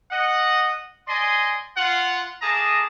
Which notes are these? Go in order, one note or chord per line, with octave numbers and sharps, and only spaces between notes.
D#5 F#5
D5 D#5 G#5 C6
F4 F#5
A3 A#3 G#4 A5 A#5 D#6